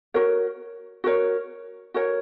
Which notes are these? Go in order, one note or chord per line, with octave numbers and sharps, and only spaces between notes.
F#4 A#4 C#5
F#4 A#4 C#5
F#4 A#4 C#5